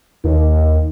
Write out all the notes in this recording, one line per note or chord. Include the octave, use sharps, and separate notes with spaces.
D#2 D#3